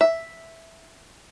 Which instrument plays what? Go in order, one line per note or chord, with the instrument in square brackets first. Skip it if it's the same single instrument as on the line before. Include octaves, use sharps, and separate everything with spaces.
[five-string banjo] E5